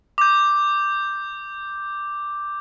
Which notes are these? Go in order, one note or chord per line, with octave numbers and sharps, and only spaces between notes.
D6 G6